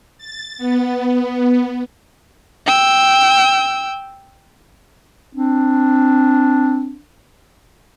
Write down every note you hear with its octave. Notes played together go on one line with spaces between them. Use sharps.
A6
B3
G5 E6
C4 D4